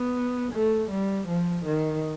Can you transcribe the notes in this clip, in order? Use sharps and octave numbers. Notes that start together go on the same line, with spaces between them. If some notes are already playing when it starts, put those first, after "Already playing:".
Already playing: B3
A3
G3
F3
D#3